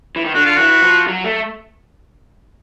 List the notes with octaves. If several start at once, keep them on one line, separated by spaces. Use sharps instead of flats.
E3
D#3
D3 F#4
F4
E3 F#4
F3
F#3
A3